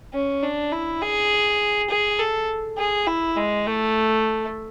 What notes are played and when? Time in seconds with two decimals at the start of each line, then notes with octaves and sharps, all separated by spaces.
0.13 C#4
0.43 D4
0.72 E4
1.01 G#4
1.90 G#4
2.19 A4
2.78 G#4
3.07 E4
3.36 G#3
3.66 A3